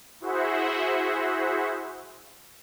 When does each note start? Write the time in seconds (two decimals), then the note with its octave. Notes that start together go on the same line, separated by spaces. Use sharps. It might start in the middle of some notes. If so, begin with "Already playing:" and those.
0.20 E4 F#4 G#4 C5 E5 F#5